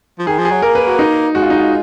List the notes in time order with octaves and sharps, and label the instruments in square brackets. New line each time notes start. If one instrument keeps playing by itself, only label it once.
[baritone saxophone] F3
[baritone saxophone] D#3 [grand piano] G#4
[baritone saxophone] F3
[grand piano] G#4
[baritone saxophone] F#3
[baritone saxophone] A#3 [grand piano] A#4
[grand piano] B4
F#4
D#4
[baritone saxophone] G#3 [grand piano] F#4
[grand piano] F4
D#4
F4